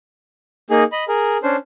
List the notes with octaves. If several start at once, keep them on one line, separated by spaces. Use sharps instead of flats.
A#3 D#4 G#4
D#5 B5
G#4 A#4
C#4 D4 C5